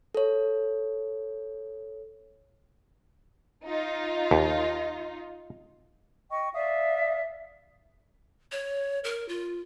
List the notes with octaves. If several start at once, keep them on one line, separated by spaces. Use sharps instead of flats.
A4 C#5
D#4 F4
D#2
D#5 G5 C#6
D5 E5 F5 D#6
C#5
A#4
F4